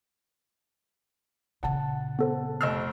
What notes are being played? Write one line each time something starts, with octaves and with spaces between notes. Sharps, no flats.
A#2 C#3 F#5 A5
B3 A4 C5
F1 D#5 E6 F6 C7